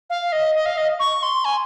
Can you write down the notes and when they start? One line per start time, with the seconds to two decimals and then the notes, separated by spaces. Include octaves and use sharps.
0.10 F5
0.32 D#5
0.55 D#5
0.66 F5
0.77 D#5
1.00 C#6
1.23 C6
1.45 G#5